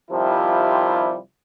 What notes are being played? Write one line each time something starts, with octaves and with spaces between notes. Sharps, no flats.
C3 D#3 F3 G3 E4 F4